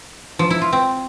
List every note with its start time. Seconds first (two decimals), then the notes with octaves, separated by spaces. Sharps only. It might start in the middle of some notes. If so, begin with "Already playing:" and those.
0.39 F3
0.50 E4
0.61 F4
0.73 C4